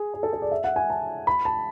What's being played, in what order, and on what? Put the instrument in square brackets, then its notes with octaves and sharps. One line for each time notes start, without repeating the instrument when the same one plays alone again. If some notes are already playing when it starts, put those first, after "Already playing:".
Already playing: [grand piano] G#4
G#4
A4
A4
D5
E5
F#5
G#5
A5
B5
A5